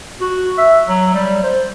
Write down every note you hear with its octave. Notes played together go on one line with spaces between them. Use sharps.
F#4
E5
F#3
G3
C5